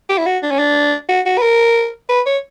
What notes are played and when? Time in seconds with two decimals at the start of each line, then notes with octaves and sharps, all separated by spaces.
0.09 G4
0.18 E4
0.26 F#4
0.43 D4
0.51 C#4
0.59 D4
1.09 F#4
1.26 F#4
1.38 B4
1.42 A#4
2.09 B4
2.26 C#5